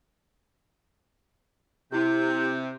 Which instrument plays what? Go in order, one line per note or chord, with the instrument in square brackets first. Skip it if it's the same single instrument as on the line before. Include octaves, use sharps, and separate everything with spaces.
[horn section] C3 [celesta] E4 G4 [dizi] G6